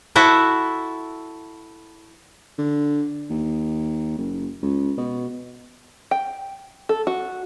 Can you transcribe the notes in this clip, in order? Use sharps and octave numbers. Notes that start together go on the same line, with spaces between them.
E4 F#4 A4
D3
D#2
F#1
C#2
B2
G5
A4
F#4